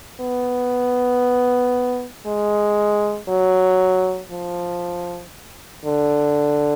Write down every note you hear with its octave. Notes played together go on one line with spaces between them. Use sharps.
B3
G#3
F#3
F3
D3